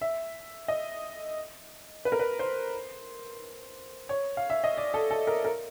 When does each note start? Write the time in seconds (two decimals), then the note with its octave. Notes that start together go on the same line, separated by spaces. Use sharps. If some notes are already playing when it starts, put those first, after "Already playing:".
0.01 E5
0.68 D#5
2.05 B4
2.12 A#4
2.19 B4
2.39 C5
4.09 C#5
4.37 F5
4.50 E5
4.64 D#5
4.77 D5
4.94 A4
5.11 A4
5.27 A#4
5.45 A#4